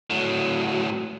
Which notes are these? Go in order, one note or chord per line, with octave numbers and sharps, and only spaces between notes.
A2 F#3